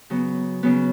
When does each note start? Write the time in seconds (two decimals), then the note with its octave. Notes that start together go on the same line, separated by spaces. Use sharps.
0.10 C#3 F#3 B3
0.63 C#3 F#3 B3